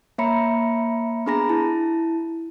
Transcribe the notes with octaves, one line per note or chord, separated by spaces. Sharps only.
A#3 C#5 E5 A#5 B5 C#7
B3 D4 G#4 A#5 B5 A#6
E4 A5